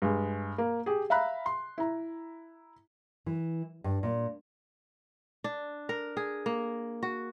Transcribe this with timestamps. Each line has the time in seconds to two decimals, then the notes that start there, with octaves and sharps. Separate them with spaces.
0.02 G2 G#3
0.58 A#3
0.86 G4 G#4
1.10 E5 F5 A#5 B5 F#6
1.46 C6
1.78 E4 A#5
3.26 E3
3.84 G2
4.03 A#2
5.44 D4
5.89 A#4
6.17 G#4
6.46 A#3
7.03 F#4